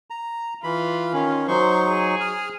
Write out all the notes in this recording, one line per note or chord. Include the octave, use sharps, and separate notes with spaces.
A#5
E3 F4 B5
D#3 C#4
F#3 D#4 C5 C#6
G#4
D#6 F6